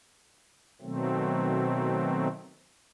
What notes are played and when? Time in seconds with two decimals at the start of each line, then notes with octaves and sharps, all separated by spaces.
0.82 B2 D#3 F#3 A3 C4